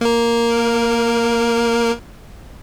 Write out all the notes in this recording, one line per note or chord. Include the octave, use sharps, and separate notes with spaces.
A#3 A#4